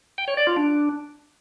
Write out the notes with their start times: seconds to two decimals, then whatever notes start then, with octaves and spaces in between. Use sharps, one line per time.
0.18 G5
0.28 C#5
0.37 D5
0.47 F4
0.56 D4